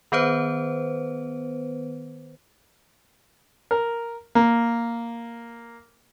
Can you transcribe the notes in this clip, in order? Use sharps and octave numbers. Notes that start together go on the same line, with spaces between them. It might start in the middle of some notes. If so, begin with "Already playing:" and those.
D#3 B3 B4 C5
A#4
A#3